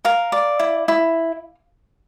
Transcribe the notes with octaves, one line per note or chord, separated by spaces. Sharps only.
A#4 F5
D5
E4
E4